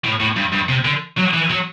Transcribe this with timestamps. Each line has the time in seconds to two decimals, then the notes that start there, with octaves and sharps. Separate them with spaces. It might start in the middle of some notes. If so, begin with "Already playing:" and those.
0.04 A2
0.20 A2
0.36 G2
0.52 G2
0.69 C3
0.85 D3
1.17 F#3
1.34 E3
1.50 F#3